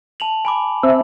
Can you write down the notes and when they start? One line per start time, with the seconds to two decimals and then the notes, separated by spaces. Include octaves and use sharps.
0.20 A5 F7 F#7
0.45 G#5 B5 D6
0.83 C4 E5